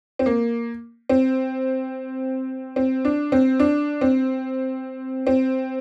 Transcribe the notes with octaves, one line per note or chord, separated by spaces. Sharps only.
C4
A#3
C4
C4
D4
C4
D4
C4
C4